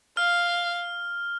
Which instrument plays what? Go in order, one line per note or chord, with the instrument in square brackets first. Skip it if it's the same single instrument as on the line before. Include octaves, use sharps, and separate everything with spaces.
[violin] F5 [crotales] F6